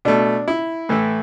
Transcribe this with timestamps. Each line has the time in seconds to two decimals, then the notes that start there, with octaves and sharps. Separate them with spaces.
0.05 B2 A3 D4
0.48 E4
0.89 A2 E3 A3